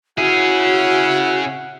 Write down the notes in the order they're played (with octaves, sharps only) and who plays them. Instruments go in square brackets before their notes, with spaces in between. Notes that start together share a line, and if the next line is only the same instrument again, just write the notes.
[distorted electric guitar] C#4 G#4 [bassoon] E4 [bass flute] F#4 [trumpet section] F#5